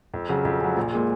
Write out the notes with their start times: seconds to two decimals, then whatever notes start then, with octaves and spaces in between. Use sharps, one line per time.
0.14 F2
0.29 C#3 F#3
0.45 F2
0.61 C#3 F#3
0.77 A#1
0.92 A#2 G#3